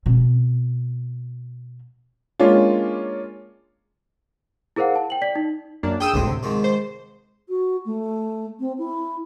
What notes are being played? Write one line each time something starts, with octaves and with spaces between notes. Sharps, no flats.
B2 C4
G#3 A#3 C#4 D4 F4
E4 G#4 A#4 C5 F5 F#5
A5
G5 F#7
D5 B6
D#4
F#2 A#3 D4
E4 G#4 G5 D#6 E6
G#1 D2 A2 D3 C4
C3
G#2 D#3 F3
C5
F#4
A3
C4
E4